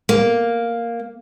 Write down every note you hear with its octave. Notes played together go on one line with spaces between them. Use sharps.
A#3